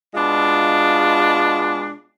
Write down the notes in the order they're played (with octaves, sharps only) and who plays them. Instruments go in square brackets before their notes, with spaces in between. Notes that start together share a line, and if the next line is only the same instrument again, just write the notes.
[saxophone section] B2 G#3 D4 F4